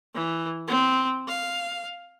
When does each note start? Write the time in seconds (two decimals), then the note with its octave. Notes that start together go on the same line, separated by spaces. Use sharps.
0.15 E3
0.68 C4
1.28 F5